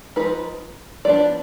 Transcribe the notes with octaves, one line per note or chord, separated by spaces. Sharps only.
F3 G#3 D#4 B4
F3 B3 D4 D5